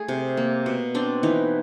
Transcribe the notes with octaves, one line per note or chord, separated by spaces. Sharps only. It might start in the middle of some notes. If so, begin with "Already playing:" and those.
Already playing: A3 G#4
C3
A#3
B2
C4 D4
E3 D#4